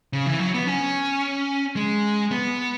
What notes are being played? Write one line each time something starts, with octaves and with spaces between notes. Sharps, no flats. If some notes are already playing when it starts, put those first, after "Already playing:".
C#3
E3
F#3
B3
C#4
G#3
B3